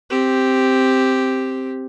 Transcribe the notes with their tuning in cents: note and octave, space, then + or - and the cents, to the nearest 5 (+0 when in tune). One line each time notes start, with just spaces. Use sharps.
C4 +0 G4 +0